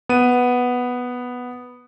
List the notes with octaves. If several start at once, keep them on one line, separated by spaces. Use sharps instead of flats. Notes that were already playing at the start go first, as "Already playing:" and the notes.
B3 D#7